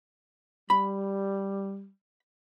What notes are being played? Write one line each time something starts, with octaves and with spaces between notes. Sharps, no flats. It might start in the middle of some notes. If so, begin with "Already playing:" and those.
G3 B5